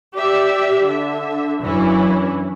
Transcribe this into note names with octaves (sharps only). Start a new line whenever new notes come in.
G4 D5 E5
D3 E5
F#2 E3 C#4 D4 E4